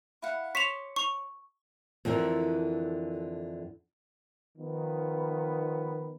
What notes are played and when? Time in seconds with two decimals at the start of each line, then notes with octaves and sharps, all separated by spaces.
0.22 E4 F5 F#5
0.55 C#5 C6 D6 B6 E7 F7
0.96 C#6 F7
2.05 F2 D3 E3 A#4
4.57 D#3 F3 B3